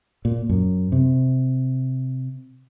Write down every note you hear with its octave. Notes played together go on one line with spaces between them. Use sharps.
A#2
F#2
C3